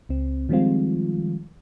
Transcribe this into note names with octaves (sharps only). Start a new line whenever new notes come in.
C#2 C4
D#3 F3 G3 G#3 C4 F4